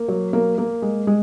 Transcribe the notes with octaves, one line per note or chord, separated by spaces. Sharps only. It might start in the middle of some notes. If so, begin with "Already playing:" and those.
Already playing: A#3
F#3
A#3
A#3
G#3
G#3